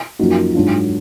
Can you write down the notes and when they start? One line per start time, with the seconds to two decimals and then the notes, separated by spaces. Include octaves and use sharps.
0.19 F#2 F3 A#3 D#4 F#4
0.54 G#2 F#3 D4 F4